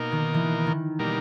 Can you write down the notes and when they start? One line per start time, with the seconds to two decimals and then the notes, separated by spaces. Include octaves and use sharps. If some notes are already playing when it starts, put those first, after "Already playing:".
Already playing: B2 A#3 D#4 A#4
0.12 D#3
0.34 E3
0.67 D#3
0.99 B2 G3 A#3 D#4 A#4